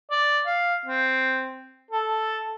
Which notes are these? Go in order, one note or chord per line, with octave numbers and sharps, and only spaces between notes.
D5
F5
C4
A4